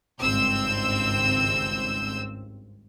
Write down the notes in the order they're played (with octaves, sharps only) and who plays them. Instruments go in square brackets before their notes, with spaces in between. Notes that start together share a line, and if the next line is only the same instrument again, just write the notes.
[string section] G#1 C#2 G2 C4 E6 G6